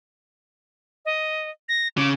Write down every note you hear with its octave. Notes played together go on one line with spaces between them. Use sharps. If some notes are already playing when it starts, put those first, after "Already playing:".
D#5
A#6
C#3 D6